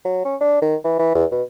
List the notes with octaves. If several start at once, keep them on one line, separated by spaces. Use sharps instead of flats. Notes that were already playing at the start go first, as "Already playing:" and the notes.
F#3
C#4
D4
D#3
E3
E3
E2
B2